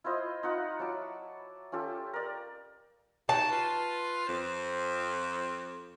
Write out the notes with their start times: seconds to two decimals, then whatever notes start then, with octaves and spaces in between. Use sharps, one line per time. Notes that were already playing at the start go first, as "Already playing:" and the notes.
0.04 E4 F4 C5 D#5
0.43 D#4 F4 F#5 B5
0.79 F#3 E4 A5 D6
1.72 C#4 F4 G4 A4
2.13 A#4 D5
3.29 D#4 F#4 G4 A5
3.50 F4 B4
4.27 F2 C5